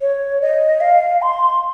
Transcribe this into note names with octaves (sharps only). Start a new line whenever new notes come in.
C#5
D#5
F5
C6